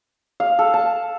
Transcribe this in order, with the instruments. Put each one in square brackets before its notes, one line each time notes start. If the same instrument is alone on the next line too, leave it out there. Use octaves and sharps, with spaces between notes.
[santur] F5
A4
A5